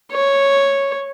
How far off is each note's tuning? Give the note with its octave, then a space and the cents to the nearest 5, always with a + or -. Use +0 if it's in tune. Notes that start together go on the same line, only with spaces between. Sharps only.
C#5 -5